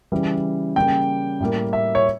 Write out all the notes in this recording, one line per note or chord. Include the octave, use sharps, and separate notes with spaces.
C#3 E3 G3
C#3 G3 A#3 G5
A2 G3 A#3
E5
C#5